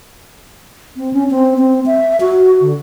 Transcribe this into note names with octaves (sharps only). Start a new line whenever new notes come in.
C4
C#4
C4
C4
E5
F#4
D3